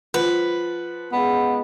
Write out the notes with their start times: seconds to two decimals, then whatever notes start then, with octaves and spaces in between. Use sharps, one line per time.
0.14 F3 B4 F#5
1.13 G#3 B3 C#4 F4